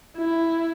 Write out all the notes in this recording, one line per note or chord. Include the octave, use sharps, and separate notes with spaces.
E4